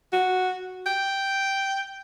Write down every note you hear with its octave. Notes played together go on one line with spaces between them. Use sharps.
F#4
G5